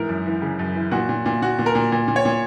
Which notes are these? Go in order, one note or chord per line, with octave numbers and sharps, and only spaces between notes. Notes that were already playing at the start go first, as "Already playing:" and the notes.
Already playing: G#2 E3 A#4
F#2
E3
C#3
F#2
E3
A#2 F#4
A#2
A#2
A#2 F#4
A#2
A#4
A#2
A#2
A#2
C#5
A#2